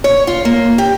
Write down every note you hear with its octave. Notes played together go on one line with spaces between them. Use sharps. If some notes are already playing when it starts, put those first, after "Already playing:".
C#5
F4
A#3
G4